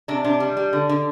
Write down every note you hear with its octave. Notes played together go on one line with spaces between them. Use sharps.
C3 D4
C3 D4
G3
G3
D3
D3